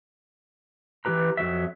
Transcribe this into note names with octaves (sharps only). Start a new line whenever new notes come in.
E3 G3 G4 B4 A#5
F2 F3 F#3 E5